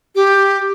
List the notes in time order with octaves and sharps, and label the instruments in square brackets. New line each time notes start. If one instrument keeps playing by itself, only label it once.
[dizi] G4